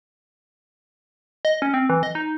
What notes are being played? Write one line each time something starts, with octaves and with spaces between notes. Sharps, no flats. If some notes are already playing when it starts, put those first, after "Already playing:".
D#5
C#4
C4
E3
D#5
D#4